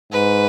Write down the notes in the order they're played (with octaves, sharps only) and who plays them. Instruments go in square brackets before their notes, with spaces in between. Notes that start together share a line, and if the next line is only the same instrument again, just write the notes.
[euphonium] G#2 [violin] B4